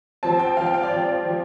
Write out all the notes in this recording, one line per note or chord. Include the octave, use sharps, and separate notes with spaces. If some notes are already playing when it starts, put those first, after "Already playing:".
F3 C4 A5
G5
F3 C4 F5
G5
F5
D5
F3 C4
F3